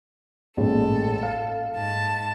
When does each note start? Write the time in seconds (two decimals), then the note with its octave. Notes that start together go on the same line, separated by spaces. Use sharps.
0.57 A1 A#2 G#3 A4
1.23 F5
1.75 G#2 A5